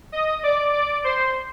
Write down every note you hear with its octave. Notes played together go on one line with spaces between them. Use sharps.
D#5 D#6
D5 D6
D5 D6
C5 C6